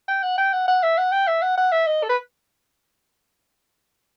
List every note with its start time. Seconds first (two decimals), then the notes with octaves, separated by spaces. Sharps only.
0.08 G5
0.23 F#5
0.38 G5
0.53 F#5
0.68 F#5
0.83 E5
0.98 F#5
1.12 G5
1.27 E5
1.42 F#5
1.57 F#5
1.72 E5
1.87 D#5
2.03 A4
2.09 B4